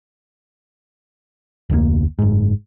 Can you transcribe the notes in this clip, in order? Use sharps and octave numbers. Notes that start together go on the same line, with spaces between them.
F1 D2 A2 A#3
F#1 G#2